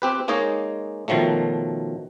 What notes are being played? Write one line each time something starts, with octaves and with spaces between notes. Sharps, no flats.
C4 G4 B4
G#3 A#3 D#4 C#5 D#5
B2 D#3 F3 F#3 A3